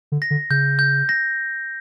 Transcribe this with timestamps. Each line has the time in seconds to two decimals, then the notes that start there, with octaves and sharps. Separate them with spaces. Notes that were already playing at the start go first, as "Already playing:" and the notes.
0.12 D3
0.22 A#6
0.31 D3
0.50 C#3 G6
0.79 G6
1.09 A#6